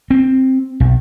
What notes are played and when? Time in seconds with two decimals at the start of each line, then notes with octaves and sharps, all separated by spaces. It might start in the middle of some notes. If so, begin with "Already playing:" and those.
0.10 C4
0.80 B1